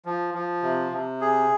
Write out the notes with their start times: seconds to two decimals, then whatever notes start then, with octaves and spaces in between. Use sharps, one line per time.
0.05 F3
0.34 F3
0.63 C3
0.92 C3
1.21 G#4